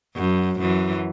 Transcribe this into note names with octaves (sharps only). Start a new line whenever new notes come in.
F#2
F#2 E3